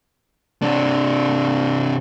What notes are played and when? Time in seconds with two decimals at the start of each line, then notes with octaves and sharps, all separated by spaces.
0.62 C3 D4